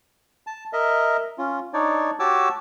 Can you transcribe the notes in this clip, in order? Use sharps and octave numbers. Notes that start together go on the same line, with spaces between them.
A5
A#4 D#5 E5
C#4 F4
D4 D#4 C#5 D5
F#4 G4 C#5 A5 D6 E6